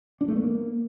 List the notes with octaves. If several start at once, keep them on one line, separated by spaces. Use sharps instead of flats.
D4
A3
B3
A#3